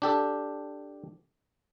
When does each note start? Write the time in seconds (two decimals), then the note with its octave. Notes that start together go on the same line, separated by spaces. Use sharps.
0.02 D4 G4 A4